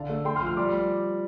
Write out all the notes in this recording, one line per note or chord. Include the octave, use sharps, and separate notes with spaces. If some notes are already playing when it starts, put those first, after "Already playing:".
Already playing: D3 F5 A5
A3
A3 G5 C6
C6 F6
F3
F6
G3 D6